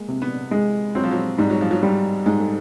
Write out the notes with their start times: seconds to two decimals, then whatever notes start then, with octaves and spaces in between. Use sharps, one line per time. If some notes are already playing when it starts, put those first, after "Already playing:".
Already playing: G#3 A#3
0.08 C3
0.22 B3
0.51 G#3
0.95 F#3 C4
1.04 F3
1.11 F#3
1.38 G#2 G3
1.50 F#3
1.61 F3
1.71 F#3
1.83 G3
2.26 G#2 G#3
2.40 A3